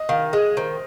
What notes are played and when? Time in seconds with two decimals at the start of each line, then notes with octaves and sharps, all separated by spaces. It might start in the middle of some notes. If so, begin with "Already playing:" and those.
Already playing: D#5
0.09 D#3 F5
0.33 G#3 D#5
0.57 D#3 C5